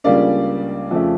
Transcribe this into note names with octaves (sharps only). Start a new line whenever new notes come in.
C#2 C#3 G3 A#3 D4 D5 F5
F2 C#3 F3 A3